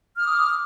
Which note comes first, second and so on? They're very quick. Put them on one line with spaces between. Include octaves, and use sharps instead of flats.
F6 D#6 D6